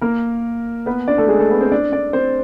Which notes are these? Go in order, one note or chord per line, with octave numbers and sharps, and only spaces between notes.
A#3 A#4
B3 B4
D4 D5
A3 A4
G#3 G#4
A3 A4
B3 B4
C4 C5
D4 D5
D4 D5
C4 C5